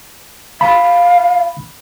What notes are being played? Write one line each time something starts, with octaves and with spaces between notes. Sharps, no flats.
F5 B5